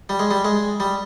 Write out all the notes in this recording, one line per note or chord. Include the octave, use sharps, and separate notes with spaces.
G3
G#3
G3
G#3
G3